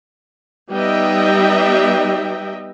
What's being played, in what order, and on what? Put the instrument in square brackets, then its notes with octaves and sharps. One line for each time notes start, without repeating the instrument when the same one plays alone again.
[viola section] G3 B3 D#4 D#5 E5 G5